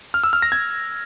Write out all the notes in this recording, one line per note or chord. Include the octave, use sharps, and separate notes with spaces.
F6
E6
F6
A#6
G#6